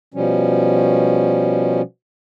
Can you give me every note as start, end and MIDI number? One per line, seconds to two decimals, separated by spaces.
0.14 1.82 47
0.14 1.82 53
0.14 1.82 55
0.14 1.82 61